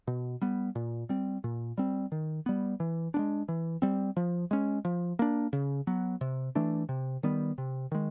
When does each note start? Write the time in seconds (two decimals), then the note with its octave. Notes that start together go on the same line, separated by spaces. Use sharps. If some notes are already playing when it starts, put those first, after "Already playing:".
0.07 B2
0.42 G3 B3
0.75 A#2
1.09 G3 C4
1.44 A#2
1.78 G3 C4
2.12 D#3
2.46 G3 B3
2.80 E3
3.14 G#3 B3 D4
3.48 E3
3.82 G3 C4
4.17 F3
4.51 G#3 C#4
4.85 F3
5.19 A#3 D4
5.53 C#3
5.87 F#3 B3
6.21 C3
6.55 E3 A3 D4
6.89 C3
7.23 D#3 G3 B3
7.58 C3
7.92 D#3 G#3